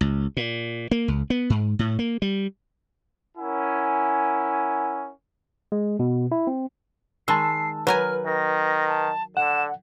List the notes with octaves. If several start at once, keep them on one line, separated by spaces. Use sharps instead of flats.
C#2
A#2
A#3
C#2
B3
G#2
A2
A#3
G3
C#4 E4 A#4 F#5 G#5
G#3
B2
E4
C4
D#3 G#3 A5 E6 C7
F#3 A#4 B4 G#5 F6
D#3 A#6
A5
D3 F#5 E7